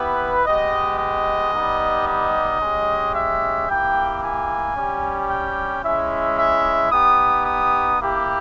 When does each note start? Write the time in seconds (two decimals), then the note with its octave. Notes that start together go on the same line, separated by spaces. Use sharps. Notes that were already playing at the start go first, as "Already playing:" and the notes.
Already playing: B3 E4 G4 B4
0.45 G#3 B3 G4 D#5
0.99 D#5
1.52 G3 B3 D#4 G4
2.07 D#5
2.61 G#3 C#4 G4
3.15 E5
3.68 A#3 E4 G4 G5
4.23 G#5
4.76 G3 C#4 G4
5.30 G5
5.83 G#3 C#4 E4 E5
6.38 E5
6.92 B3 D#4 G4 D#6
7.46 D#6
8.00 A#3 E4 G4